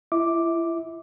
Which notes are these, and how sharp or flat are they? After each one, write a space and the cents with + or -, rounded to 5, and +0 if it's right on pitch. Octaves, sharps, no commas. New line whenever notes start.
E4 +35 E5 -30 D6 +0